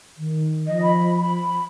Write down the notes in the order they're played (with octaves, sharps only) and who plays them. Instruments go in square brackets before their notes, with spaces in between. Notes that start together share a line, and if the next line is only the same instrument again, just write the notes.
[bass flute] D#3
[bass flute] F3 [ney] D#5
[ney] B5
B5